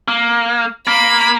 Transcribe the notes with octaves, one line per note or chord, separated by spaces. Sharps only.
A#3
A#3 B5